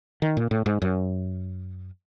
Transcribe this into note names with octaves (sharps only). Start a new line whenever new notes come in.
D#3
A#2
A2
G#2
F#2